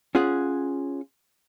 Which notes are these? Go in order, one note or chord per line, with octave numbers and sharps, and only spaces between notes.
C#4 F4 G#4 F#5